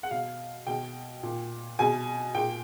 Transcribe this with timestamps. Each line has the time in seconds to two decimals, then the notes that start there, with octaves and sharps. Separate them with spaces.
0.03 F#5
0.11 B2 F5
0.67 B2 G5
1.23 A#2
1.79 B2 G#5
2.35 A#2 G5